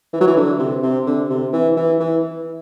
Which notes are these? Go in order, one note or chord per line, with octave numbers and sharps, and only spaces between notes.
E3
F#3
E3
D3
C3
C3
D3
C3
E3
E3
E3